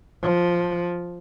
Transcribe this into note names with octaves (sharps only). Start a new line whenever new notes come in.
F3